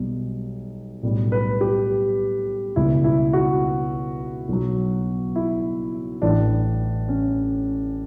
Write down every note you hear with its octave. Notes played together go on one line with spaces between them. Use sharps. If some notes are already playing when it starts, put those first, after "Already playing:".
Already playing: B1 B2 G3
B1 A2 G3
B4
G4
C#2 B2 G3 E4
E4
F#4
B1 B2 F#3
E4
A1 A2 E3 D4
C#4